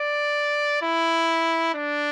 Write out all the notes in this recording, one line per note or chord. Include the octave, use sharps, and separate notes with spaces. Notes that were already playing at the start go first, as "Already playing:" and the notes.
Already playing: D5
E4
D4